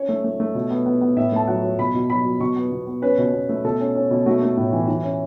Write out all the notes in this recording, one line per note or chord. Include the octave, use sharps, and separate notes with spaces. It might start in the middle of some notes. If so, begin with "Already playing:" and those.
Already playing: C#4 C#5
A3
A3
A3
B2
B3
B3
B3
A2 E5
A3 A5
F#3 F#5
F#3
B2 B5
B2
F#3 B5
F#3
B2 C#6
B3
B2
B3
C#4 B4
B2
B2
A3
B2 A4
C#4
C#4
B2
A3 F#4
A3
A2
E3
E3
C#4